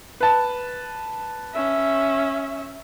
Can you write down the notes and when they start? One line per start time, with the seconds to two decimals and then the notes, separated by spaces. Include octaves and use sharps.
0.20 B4 A5
1.53 C#4 E5